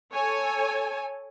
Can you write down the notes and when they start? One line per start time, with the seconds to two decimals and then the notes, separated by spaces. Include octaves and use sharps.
0.12 A4 C#5 G#5